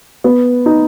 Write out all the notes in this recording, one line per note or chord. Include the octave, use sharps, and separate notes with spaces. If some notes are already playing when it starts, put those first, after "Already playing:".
B3
D#4